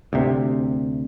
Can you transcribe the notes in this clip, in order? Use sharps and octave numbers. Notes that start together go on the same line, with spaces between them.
D2 C3